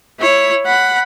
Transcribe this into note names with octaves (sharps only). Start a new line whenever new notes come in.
E4 C#5
F#5 B5